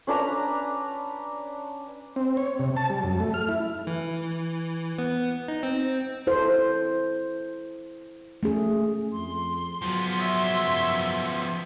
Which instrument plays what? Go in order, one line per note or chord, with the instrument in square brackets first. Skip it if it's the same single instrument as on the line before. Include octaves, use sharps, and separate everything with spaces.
[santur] C#4 D4 B4 A#5
[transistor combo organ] C4
C#5
C3
A5
G3
F#2
A3
F6
E4
[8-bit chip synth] E3
B3
D#4
C4
[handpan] E4 A4 C5
A3 C#4 G#4
[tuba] F2 [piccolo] C6
[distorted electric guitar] F3 B3 [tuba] F#3
[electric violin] C#5 E5
[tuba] F#2